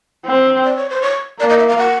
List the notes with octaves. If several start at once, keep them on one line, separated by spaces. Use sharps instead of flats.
C4
D5
C#5
C5
C#5
A#3 D5
D#5
E5
F5
F#5